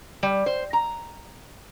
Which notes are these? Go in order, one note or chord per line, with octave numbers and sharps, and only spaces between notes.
G3
C5
A#5